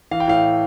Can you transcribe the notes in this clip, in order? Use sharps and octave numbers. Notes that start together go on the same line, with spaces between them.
E3 F5
G5
A2 F5